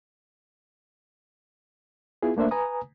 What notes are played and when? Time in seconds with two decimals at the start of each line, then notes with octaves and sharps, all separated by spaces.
2.23 B3 E4 F4 G#4
2.37 A3 A#3 D4 C5 E5
2.51 B4 G#5 A#5 D#6